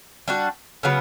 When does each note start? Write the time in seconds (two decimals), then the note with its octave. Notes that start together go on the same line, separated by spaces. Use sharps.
0.28 G3 D4 F#4
0.83 C#3 F#3 B3